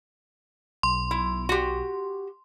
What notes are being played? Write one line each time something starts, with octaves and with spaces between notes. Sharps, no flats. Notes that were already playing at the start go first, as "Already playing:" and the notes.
B1 C6
E4
F#4 G4